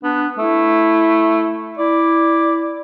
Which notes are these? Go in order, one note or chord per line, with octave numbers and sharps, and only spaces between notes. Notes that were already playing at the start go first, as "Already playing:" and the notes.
B3 D4
A3 E4
E4 D5